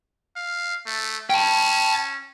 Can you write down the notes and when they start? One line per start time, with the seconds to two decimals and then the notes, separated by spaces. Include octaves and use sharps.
0.36 F5
0.86 A3
1.30 C#4 G5 A5